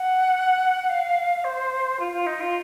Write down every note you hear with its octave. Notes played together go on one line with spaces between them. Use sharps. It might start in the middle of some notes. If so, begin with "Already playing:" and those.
Already playing: F#5
F5
C5
F4
F4
D#4
F4